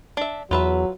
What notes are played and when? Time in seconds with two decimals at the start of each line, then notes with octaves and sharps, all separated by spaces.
0.17 D4 E5
0.51 E2 F#3 F4 B4 E5